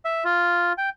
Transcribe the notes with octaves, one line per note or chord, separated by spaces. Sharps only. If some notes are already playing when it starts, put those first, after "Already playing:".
E5
F4
G5